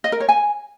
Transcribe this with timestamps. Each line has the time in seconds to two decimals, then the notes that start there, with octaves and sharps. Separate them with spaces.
0.04 D#5
0.12 A#4
0.20 C#5
0.29 G#5